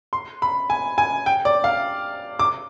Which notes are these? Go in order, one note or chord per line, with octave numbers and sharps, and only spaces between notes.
C6
B5
G#5
G#5
G5
D5
F5
D6